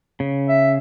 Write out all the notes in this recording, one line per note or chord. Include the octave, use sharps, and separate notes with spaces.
C#3
E5